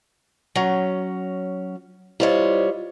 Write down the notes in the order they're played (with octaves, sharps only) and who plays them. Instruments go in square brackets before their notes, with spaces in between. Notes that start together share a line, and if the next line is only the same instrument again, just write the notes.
[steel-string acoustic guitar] F#3 C#4
[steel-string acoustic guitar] G3 F4 C#5 [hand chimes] E4 C5 D#5